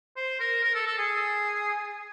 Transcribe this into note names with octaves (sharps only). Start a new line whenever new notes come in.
C5
A#4
A#4
A4
A4
G#4